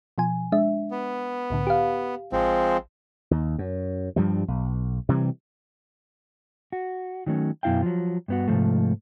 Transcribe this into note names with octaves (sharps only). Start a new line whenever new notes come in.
B2 F3 G#5
G#3 D4 E5
B3
C2 A2 D3
G4 F5
A1 F3 G#3 C4
D#2
F#2
G2 F3 G3
B1
C3 E3 G3
F#4
D#3 F#3 A3 C#4
F#2 B2 E4 F5 G5
F3 F#3
G2 B3 F#4
G#2 C3 F3 A3